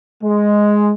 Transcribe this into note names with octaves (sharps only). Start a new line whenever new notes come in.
G#3